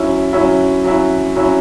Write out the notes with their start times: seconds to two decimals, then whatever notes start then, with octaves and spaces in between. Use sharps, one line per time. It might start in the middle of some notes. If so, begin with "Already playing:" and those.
Already playing: F#3 C#4 E4
0.33 F#3 C#4 E4
0.84 F#3 C#4 E4
1.36 F#3 C#4 E4